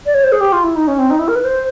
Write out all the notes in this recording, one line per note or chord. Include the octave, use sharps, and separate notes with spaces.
D5
C#5
C5
G#4
G4
F4
E4
D#4
C#4
C4
D#4
E4
A#4
B4
C5